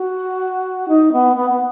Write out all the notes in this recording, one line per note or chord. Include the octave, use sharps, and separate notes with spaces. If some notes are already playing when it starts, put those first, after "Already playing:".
Already playing: F#4
D#4
B3
B3
B3